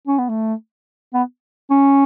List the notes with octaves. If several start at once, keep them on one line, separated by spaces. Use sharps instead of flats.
C#4
B3
A3
B3
C#4